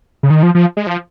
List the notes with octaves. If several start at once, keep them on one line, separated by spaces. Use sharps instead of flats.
C#3
D#3
F3
F3
G#3
F3